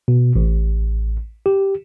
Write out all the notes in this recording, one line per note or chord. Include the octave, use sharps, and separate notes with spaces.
B2
A1
G4